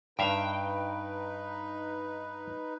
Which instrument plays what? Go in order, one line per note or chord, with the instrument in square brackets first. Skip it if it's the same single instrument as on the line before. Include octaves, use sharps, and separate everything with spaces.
[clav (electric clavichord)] G2 E5 F5 [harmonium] D#4 B4 [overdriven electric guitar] G5